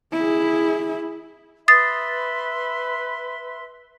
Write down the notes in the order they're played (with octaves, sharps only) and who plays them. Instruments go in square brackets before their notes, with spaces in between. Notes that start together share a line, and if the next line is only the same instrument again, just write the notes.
[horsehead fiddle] E4 G#4
[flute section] B4 E5 C6 [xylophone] D#6 A6 C7